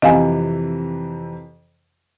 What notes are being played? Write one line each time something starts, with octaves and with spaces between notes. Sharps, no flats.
F2 C3 E3 D#5 F5 G#5